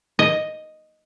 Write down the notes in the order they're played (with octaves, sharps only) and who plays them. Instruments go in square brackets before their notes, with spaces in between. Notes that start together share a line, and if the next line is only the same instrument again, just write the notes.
[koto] D#5